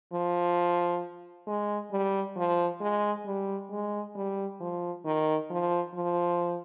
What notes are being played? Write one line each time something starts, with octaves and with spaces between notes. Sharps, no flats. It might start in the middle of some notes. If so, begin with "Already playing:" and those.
F3
G#3
G3
F3
G#3
G3
G#3
G3
F3
D#3
F3
F3